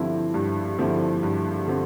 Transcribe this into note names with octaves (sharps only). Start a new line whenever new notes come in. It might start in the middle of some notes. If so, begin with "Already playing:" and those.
Already playing: G2 D3 F3 C4 E4
G2
D3 F3 C4 E4
G2
D3 F3 C4